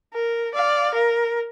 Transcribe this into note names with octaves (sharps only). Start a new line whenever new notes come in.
A#4
D5 F5
A#4